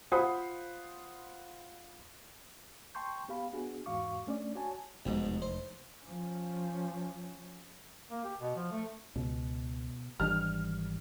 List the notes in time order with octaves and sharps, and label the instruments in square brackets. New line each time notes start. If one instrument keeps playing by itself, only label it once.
[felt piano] F4 C5 F#5 B5 D#6
[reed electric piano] G5 A5 C6 C#6 G6
B3 G4 F5 B5
B3 D4 F#4 G#4
E2 G#2 F#4 F5 C#6 D6
A3 C#4 D4 D5
F#4 C#5 G#5 A5
[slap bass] F1 E2 [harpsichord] B1 G#2
[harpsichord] C5
[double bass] F3 C#4
[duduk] A#3
G4
B2
F3
A3
[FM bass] C#2 [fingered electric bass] B2
[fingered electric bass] G#1 E3 D4 [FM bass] G3 [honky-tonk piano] F6